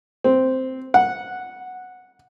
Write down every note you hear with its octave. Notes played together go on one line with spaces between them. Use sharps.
C4
F#5